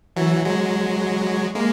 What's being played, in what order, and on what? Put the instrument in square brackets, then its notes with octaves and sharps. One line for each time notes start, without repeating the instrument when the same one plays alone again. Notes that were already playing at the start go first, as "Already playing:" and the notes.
[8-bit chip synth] E3 F#3
F#3 G#3
G#3 A#3